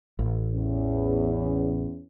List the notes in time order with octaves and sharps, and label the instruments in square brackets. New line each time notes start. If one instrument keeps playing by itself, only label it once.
[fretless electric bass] A1
[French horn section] E2 C#4